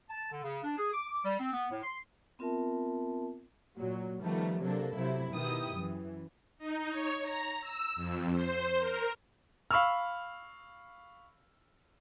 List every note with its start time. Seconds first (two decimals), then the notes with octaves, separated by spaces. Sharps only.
0.09 A5
0.32 D3
0.43 C#3
0.64 D4
0.77 G#4
0.93 D6
1.08 D6
1.25 G3
1.40 C4
1.53 B3
1.71 A2
1.83 C6
2.39 B3 C4 F4 A#4 E5 A5
3.76 A#2 F#3
4.23 D#3 F3 G3 A3 B3
4.62 C3 F#3 A#3 D4 A4
4.95 C3 F#3 E4
5.33 B2 D#3 E4 G4 D#6
5.75 F#2 E3
6.59 D#4
6.91 C#5
7.21 A#5
7.61 E6
7.96 F2
8.33 C5
8.79 A#4
9.71 F5 B5 C#6 E6 F6